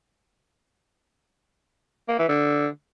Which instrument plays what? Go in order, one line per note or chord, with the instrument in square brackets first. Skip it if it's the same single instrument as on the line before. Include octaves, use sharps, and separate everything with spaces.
[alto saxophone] A#3
E3
D3